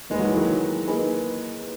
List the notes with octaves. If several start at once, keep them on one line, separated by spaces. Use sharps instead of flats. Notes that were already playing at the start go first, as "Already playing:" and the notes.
G#3 A#3 D#4 G#4 B4
F#3
E3
D#3 F#3
A#3 D#4 G#4 B4